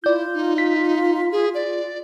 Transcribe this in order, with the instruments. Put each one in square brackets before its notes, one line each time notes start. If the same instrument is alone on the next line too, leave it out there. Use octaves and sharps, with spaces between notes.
[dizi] E4 [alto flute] F4 [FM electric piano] D5 G6
[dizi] D#4
[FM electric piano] B6
[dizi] G#4
D5